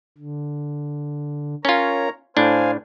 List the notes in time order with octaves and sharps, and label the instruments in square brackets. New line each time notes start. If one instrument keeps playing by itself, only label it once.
[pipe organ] D3
[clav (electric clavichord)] C#4 F4 [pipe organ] A#4 C#5 A#5
[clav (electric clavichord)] A2 D4 [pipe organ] C5 F5 G#5